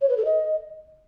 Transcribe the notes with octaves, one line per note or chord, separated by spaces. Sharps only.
C#5
B4
A4
D#5